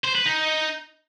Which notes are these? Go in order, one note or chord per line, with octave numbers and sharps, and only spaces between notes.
C5
B4
D#4